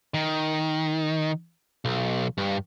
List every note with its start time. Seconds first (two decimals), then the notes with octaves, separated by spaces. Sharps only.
0.14 D#3
1.85 B1
2.38 G2